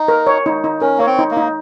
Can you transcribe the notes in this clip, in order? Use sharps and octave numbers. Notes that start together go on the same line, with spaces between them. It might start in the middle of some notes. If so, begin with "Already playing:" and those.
Already playing: D#4
A#4
C#5
D#4
D#4
C#4 A#4
A#3 C#5
C4
D#4
A#3
D#4